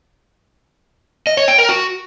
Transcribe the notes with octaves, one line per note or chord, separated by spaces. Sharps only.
D#5
C#5
G5
A#4
F#4